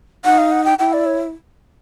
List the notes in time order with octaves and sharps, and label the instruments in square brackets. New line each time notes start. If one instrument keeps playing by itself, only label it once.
[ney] D#4 [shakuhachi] F#5
[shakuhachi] F5
F#5
G5
[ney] E4 [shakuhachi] G5
[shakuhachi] D5
C#5